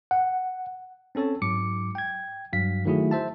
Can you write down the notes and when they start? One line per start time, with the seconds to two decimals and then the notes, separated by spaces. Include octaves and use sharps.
0.11 F#5
1.15 C4 C#4 A4 C#5 A5
1.42 G#2 F#3 D6 C#7
1.95 G5 G#6
2.53 G2 F#3 F5 B6
2.85 D#3 F#3 A3 E4 F#4 G#4
3.11 C5 E5 A5